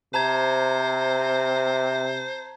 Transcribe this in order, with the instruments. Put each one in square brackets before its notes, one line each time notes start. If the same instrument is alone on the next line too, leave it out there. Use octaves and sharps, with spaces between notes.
[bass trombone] C3 [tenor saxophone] C5 [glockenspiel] A5 A#5 G#6